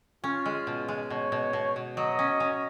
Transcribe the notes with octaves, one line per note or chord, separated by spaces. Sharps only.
C#4 F4
G#3
B2
G#3
B2 C#5
B2
B2
B2
F#3 D#5
C#4
C#4